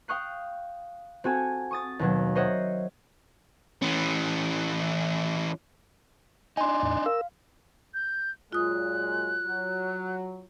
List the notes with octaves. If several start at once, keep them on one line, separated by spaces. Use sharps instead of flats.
F5 G5 C#6 D#6 F#6 C7
C4 F#4 A4 G#5
C#6 D#6 A6
D#2 B2 F#3
A#4 C5 C#5 D#5 E5 F#5
E3 C#4
D4 D#4 G#5 C6
E2 A2
A#4 F5 E6
G6
A#2 F#3 G#3 F4 D#6 F#6
F#3